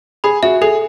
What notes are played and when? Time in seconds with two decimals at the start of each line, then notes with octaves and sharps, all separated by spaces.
0.24 G#4 B5
0.43 F#4 E5
0.61 G#4 A4